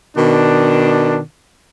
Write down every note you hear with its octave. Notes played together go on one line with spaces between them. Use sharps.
B2 D#3 D4